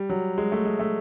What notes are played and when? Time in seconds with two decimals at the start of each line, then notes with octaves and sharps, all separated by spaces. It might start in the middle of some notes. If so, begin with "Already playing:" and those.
Already playing: G3
0.09 F#3
0.38 G#3
0.52 A3
0.65 G#3
0.79 A3